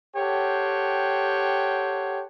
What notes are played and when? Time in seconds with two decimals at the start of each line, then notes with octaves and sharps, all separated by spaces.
0.16 G4 A4 C5 C#5 F#5 G5